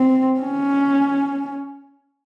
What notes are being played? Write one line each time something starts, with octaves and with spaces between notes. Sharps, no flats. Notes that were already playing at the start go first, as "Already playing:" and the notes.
Already playing: C4
C#4